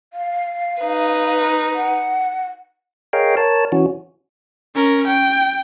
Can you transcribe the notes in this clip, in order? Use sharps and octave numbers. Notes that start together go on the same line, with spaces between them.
F5
D#4 B4
F#5
G#4 A#4 C#5 D#5 F5 G5
A#4 C#5 A5
E3 C#4 F#4
C#4 A#4
G5